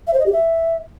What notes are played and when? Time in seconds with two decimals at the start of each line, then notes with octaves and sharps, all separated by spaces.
0.07 E5
0.13 C5
0.20 D#5
0.26 G4
0.32 E5